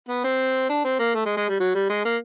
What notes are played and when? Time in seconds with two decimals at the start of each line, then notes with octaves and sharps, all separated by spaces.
0.09 B3
0.24 C4
0.69 D4
0.85 C4
0.99 A#3
1.14 A3
1.25 G#3
1.37 G#3
1.49 G3
1.60 F#3
1.75 G3
1.89 G#3
2.05 A#3